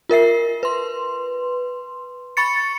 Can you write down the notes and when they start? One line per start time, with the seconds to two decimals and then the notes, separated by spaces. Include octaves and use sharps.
0.09 F4 A#4 E5 C7
0.63 B4 C6
2.37 B5 C#6 A6 C#7